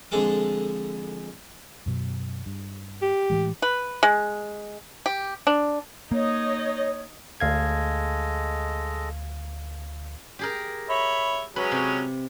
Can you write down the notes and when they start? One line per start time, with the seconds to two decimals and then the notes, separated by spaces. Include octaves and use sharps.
0.11 F2 D3 G#3 G#4 A4 D6
1.86 F#2 B2 F#3
2.46 G2
3.02 G4
3.30 A2 E3 G#3
3.62 B4
4.03 G#3
5.06 G4
5.47 D4
6.12 A#3 D#4 C#5 D#5
7.40 D2 G#3 A4 D#5 F5 G#6
10.39 G4 G#4 A#4
10.90 C#5 E5 B5
11.56 F#3 G#3 C#4 B4
11.71 C3